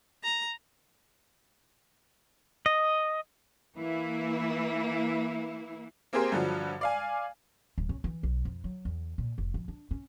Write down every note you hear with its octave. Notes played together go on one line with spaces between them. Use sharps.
A#5
D#5
E3 A#3 E4
A#3 C4 G4 G#4 A#4 C5
G2 D3 F3 F#3
D5 F5 G#5
D1
C#4
E3
B1
F2
F#3
E2
A#2
F1
F2
D4
C#4